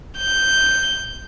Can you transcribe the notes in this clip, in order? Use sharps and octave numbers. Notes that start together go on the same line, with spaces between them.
G6